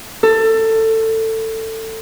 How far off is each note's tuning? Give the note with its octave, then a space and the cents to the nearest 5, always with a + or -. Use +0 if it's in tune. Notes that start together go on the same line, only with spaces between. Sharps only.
A4 +20